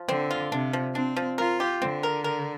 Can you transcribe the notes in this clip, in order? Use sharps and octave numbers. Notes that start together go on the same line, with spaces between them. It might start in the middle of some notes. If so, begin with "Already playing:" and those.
Already playing: F3
D3 C4
F4
C3 D4
F3
C4 D4
F3
F4 A#4
G4
D3 C4
A#4
A#4